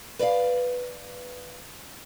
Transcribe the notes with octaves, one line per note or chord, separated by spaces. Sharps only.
B4 D5 E5 F5